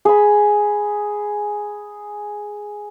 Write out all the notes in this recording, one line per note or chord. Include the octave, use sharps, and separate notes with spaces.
G#4 B5